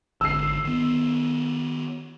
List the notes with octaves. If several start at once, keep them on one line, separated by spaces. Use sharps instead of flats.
G#1 D3 E6 C7
D#3 B3